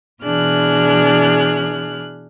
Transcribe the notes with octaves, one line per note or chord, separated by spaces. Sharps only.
B2 E3 D4 G#4 F6 F#6